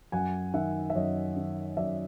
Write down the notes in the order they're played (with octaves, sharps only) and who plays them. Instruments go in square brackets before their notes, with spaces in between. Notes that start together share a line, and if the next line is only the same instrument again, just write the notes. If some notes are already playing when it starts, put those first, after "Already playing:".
[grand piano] F#2 F#5 G#5
D#3 E5 F#5
E5
F#2 C#5 D#5
D#3
F#2 D5 E5